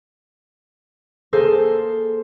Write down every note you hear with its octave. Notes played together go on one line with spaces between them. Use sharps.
A#3 G#4 A4 C5